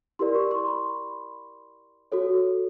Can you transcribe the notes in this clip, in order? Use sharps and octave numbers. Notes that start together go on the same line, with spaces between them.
E4 G4 A#4 D5 C6
C#6
C6
B5
F#4 A4 C#5